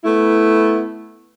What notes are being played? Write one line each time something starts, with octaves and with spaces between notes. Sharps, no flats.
A3 B3 E4